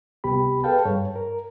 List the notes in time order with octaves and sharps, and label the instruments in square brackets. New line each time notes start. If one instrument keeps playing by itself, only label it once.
[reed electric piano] C2 B3 G4 B5
G#4 A4 B4 F5 G5 A5
G2 C#5
A#4